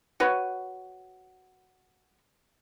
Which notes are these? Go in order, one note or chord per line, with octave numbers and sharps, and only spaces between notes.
F#4 B4 C#5